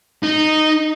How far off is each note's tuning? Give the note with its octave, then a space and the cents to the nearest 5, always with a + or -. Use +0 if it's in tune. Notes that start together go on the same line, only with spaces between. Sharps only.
D#4 -10